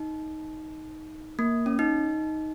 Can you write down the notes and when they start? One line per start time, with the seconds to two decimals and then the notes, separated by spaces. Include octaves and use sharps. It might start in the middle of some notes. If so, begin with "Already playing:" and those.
Already playing: D#4
1.39 A#3
1.66 C#4
1.79 D#4